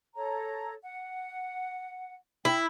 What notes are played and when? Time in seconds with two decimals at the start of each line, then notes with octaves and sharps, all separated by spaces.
0.15 A4 C#5 A#5
0.83 F#5
2.45 E4 G5